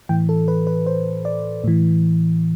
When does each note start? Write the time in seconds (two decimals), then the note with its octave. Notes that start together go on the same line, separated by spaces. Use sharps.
0.09 A2 E3 G5
0.29 A4
0.48 B4
0.67 B4
0.86 C5
1.25 D5
1.64 A2 E3